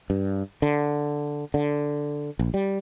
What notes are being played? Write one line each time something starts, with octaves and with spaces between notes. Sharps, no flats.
G2
D3
D3
A#1
G3